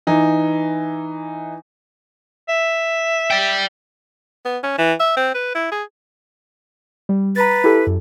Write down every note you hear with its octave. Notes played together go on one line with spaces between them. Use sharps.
E3 D#4
E5
D5 G5
B3
C#4
E3
E5
C4
B4
E4
G#4
G3
B4 A#5 A6
E4 G4 A4
F#2